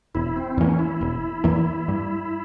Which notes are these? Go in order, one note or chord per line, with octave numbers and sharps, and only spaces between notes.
E1 E4
C4
E2 E3 A#3 C#4
E4
E1
E2 E3 A#3
G2